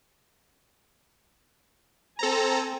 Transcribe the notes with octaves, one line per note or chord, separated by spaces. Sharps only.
C4 A4 G#5 A#5